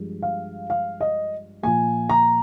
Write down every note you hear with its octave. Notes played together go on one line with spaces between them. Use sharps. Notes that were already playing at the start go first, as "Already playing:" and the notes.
Already playing: G2 F3 G#3
F5
F5
D#5
A#2 F3 A#3 G#5
A#5